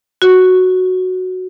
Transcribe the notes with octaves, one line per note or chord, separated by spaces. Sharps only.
F#4